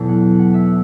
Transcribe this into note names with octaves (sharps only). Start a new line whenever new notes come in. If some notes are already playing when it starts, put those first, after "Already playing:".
Already playing: E2 B2 F#3 A3
F#5
F#5
E5